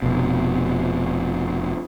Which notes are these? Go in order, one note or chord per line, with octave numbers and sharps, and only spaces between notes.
F1 B2